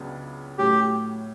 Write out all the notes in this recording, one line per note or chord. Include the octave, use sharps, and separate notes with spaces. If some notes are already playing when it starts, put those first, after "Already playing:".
Already playing: C#2 C#3 F#3 B3 D4
A2 F#3 A3 C#4 G4